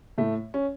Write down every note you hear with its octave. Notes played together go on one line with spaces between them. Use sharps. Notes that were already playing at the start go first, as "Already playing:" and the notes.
A2 A3
C#4